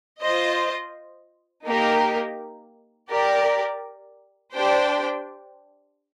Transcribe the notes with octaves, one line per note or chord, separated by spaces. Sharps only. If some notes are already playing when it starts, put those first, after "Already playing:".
F4 C5 D#5
A#3 D#4 G4 A#4
G4 A#4 D5
D4 G4 C5 G5